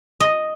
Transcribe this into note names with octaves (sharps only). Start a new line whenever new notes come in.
D#5